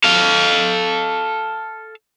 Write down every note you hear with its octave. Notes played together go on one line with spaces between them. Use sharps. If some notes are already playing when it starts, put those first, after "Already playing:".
A4 F5